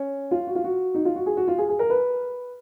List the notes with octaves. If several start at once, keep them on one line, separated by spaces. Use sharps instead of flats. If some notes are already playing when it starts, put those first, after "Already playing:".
Already playing: C#4
F4
F#4
F4
F#4
D#4
F4
F#4
G#4
F#4
F4
G#4
G#4
A#4
B4